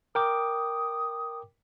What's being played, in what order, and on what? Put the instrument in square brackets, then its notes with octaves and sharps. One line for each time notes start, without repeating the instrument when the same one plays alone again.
[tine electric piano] A#4 G5 D6 [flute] D#6